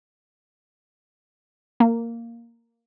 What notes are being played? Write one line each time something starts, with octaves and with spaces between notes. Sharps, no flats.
A#3